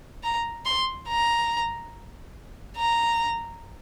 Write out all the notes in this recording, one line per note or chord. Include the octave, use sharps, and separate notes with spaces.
A#5
C6
A#5
A#5